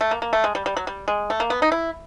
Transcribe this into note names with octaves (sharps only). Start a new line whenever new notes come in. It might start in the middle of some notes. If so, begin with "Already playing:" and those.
A3
A#3
A#3
A3
G#3
G3
G3
F#3
G3
G#3
A3
A#3
B3
D#4
E4